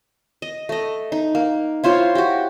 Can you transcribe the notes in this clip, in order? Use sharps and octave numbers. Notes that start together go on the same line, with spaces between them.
D#5
A3 D#5
D#4
A#3
E4 F4 C5 C#5
F#4 G4